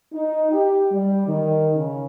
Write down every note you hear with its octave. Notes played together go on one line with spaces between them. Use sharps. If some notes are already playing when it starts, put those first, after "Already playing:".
D#4
G4
G3
D#3
C#3